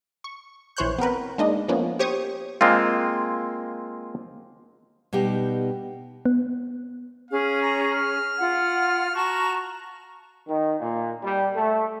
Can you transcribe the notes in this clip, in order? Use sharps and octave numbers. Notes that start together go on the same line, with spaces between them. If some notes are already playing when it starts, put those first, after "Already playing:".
C#6
A#1 E3 C5 C#5 F#6 G6
B3 C4 A#4 B4
G#3 A#3 D4 D#4 D#5
F3 A#3 B3 C#4
G4 C5 C#5 C#6 D#6
G#3 A#3 C4 F4
B2 G3 D#4 G4
B3
C#4 G#4 F5
A#5
F6
F4 F#5
F#4 A5 A#5 C#6
D#3
A#2
G3
A3